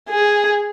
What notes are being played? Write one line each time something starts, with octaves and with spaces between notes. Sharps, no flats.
G#4